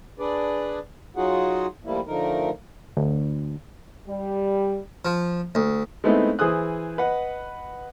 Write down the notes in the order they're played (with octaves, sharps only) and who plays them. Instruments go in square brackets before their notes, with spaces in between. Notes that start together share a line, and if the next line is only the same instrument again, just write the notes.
[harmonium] D4 G#4 B4 D5
F#3 D#4 F4 F#4 G#4 F#5
F3 G3 A3 A#3 E4
D3 F3 A3 D#4 A#4
[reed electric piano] D2
[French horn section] G3
[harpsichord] F3
D2
[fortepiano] G#3 A3 B3 C4 D#4 E4
E3 G#4 C5 D#6 F#6
B4 D#5 F#5